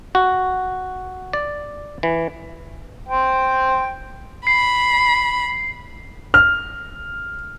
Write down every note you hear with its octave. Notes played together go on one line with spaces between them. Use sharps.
F#4
D5
E3
C5 G5
B5 C7
F6